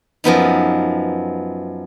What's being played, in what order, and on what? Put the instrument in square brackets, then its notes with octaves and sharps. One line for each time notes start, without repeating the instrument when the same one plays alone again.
[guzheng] F#2 F3 B3 D#4